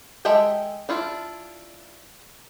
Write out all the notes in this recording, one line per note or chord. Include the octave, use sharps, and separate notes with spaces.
G#3 A4 D#5 E5 G5
D4 E4 F4